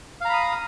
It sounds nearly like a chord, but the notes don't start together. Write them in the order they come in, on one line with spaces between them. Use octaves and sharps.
F5 A#5 B5 D#6